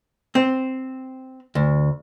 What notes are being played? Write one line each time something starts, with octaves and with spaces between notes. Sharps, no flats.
C4
D2